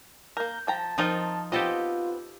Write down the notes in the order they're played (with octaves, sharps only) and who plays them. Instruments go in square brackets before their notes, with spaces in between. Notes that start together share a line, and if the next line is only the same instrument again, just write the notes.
[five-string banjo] A#3 A#4 [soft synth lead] G6
[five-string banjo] F3 G5 A#5 [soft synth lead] A5
[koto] F3 D#4 F4 [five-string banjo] C4 A#4
[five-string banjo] B3 C4 [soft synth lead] F4 [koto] G4 A4 D#5